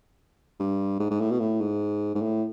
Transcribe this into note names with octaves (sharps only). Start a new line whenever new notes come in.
G2
G#2
G#2
A2
B2
A2
G#2
G#2
A2